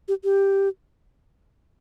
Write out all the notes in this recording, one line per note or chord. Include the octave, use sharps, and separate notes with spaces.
G4
G4